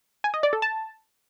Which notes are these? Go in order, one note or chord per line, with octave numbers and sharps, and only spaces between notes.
G#5
D#5
D5
A4
A5